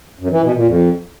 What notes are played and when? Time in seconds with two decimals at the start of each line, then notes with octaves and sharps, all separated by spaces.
0.19 F#2
0.31 E3
0.43 B2
0.55 A#2
0.67 F2